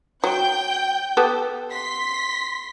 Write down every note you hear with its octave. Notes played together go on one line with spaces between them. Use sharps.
F#3 G5 G6
B3 G4 A4
C6 B6